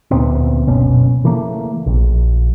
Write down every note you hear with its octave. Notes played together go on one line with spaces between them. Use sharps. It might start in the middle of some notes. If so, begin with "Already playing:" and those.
D2 A#2 B3 C4
F#1 B2 C#4
C#3 E3 A3 A#3
A#1